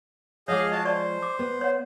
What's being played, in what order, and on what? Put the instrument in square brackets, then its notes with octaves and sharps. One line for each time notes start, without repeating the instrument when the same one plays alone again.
[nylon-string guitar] F3 G#3 [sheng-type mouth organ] G#4 D#5 F5 [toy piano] C#5 F#5 D6
[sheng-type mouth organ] F#4 F5 A5 [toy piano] D#5 G#5
[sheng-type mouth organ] C5 [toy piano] D5 A5 C#6
[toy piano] D6
[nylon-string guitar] B3
[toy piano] C#5 F#5